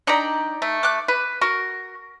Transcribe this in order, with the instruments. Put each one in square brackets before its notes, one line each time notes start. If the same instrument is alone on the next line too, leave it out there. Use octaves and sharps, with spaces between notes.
[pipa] D4 G4 [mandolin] D#4 D5 A#5
[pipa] A3
[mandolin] D6 F#6
[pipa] B4
[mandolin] F#4 [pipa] A#4